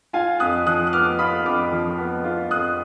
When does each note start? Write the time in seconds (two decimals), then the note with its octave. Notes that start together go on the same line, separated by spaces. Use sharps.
0.13 F4 F5 G#5
0.40 F2 D#6 F#6
0.66 F3 D#6 F#6
0.87 F#6
0.92 B3 D6 F6
1.19 F4 B5 D#6
1.45 F2 D6 F6
1.72 F3
1.98 B3
2.24 F4
2.50 F2 D#6 F#6